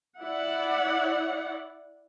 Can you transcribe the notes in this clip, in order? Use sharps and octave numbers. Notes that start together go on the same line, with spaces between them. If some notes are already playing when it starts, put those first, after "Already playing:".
E4 D5 F#5